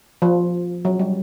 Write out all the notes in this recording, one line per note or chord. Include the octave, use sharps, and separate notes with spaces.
F3
F#3
G3